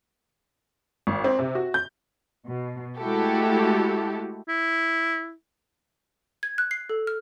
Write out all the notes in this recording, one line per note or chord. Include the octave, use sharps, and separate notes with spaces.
G#1
C4
C3
F#4
G6
B2
G#3 A3 E4 F#4 G4 A4
E4
G#6
F#6
C7
A4
F6